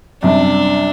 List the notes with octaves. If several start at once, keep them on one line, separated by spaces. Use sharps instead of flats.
F#2 C3 G3 D4